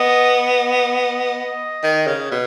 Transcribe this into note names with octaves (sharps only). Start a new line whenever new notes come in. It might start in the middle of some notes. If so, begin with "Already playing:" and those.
Already playing: B3 D#5
D#5
D#3
C#3
B2